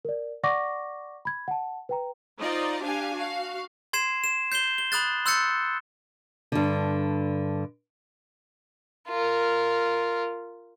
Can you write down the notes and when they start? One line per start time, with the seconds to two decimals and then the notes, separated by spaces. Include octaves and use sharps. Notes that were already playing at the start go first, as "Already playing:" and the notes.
0.05 A#4 D5
0.43 D5 F#5 C#6 D6 A#6
1.25 B5 G#6
1.48 F#5 A5
1.89 B4 G5 A#5
2.38 D#4 F4 C5 D5 D#5
2.82 D4 G4 F5 G#5
3.15 F#4 F5
3.93 C6 G#6 C7 E7
4.24 E7
4.52 G6 C7 E7 G7
4.78 G7
4.92 B5 D#6 F#6 A6
5.26 C6 E6 F#6 G6 A6 C#7
6.52 G2 D3
9.08 F4 A#4